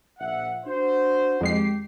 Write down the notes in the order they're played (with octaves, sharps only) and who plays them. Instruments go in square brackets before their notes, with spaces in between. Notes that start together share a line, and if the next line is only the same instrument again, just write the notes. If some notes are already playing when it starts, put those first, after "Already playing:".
[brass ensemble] A#1 E5 F#5
D4 F#4 C5
[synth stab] F2 G#3 C7 [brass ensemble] D#3 G4